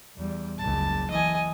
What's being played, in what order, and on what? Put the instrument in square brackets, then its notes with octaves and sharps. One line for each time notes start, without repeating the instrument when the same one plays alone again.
[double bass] E2 G3
[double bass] F#1 C#2 [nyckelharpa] A5
[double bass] E3 [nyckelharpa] D#5 G#5